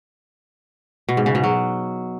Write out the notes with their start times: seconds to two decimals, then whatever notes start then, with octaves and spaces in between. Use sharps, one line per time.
1.09 B2
1.17 G#2
1.26 C#3
1.35 B2
1.44 F#3